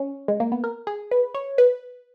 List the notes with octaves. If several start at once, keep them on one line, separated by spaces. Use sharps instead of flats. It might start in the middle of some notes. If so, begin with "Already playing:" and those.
Already playing: C#4
G#3
A#3
B3
A#4
G#4
B4
C#5
B4